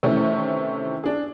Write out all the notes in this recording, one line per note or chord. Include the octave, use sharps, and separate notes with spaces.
C3 D#3 E3 A3 C4 C#4
D4 G#4